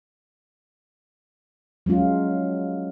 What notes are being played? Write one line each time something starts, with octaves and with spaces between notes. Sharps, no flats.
F#3 G#3 C#4 F4